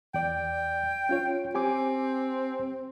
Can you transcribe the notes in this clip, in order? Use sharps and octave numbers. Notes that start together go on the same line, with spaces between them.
E2 D5 G5
C#4 F4 C#5
C4 G4 G#5 D6